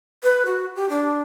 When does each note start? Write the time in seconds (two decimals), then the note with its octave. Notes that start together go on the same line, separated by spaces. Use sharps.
0.23 B4
0.46 F#4
0.76 G4
0.89 D4